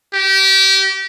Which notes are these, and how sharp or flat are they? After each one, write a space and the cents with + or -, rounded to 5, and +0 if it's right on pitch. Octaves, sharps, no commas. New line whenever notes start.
G4 -25